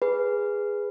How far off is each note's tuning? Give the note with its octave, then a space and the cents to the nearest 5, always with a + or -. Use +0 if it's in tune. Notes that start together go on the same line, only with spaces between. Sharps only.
G#4 -10 B4 +0